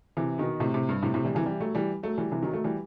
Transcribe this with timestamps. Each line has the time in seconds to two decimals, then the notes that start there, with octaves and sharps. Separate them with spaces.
0.17 C3 E3
0.38 B2 D#3
0.60 A2 C3
0.74 A2 C3
0.89 G2
1.03 A2 C3
1.14 A2 C3
1.25 E3 G3
1.35 C3 E3
1.46 E3 G3
1.60 F#3 A3
1.75 E3 G3
2.03 F#3 A3
2.18 E3 G3
2.32 C3 E3
2.42 D#3 F#3
2.53 F#3 A3
2.64 E3 G3